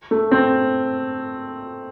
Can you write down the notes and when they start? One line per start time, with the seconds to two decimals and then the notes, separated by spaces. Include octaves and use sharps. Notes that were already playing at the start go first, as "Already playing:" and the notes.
0.11 A3
0.31 C4